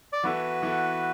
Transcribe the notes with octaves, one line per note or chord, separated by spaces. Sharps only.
D5
E3 B3 E4 F#4 A4 B4
E3 B3 E4 A4